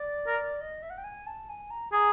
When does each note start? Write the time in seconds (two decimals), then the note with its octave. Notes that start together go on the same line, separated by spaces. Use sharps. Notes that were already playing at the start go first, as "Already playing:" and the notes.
Already playing: D5
0.27 A#4
0.61 D#5
0.83 E5
0.90 F#5
0.98 G5
1.04 G#5
1.27 A5
1.49 G#5
1.71 A#5
1.92 G#4 A#5